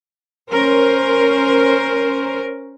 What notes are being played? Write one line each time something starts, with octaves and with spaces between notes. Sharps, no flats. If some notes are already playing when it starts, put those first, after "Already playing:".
C#4 A#4 C5